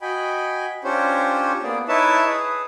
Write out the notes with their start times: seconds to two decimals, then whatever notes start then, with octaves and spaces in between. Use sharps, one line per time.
0.01 F#4 D#5 G5 G#5 B5
0.84 C#4 D4 F4 G4 C5 C#5
1.63 A#3 B3 G#4 D5
1.88 D#4 E4 B4 C#5 E5 A5
2.26 G#4 B4